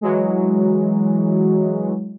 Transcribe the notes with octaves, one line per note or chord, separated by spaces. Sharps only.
E3 F#3 G#3